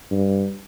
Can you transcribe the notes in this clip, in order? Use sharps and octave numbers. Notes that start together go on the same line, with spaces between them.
G2